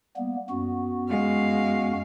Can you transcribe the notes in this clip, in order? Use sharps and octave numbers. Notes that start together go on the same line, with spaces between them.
G3 A#3 B3
F#2 B3 F#4
G#3 F5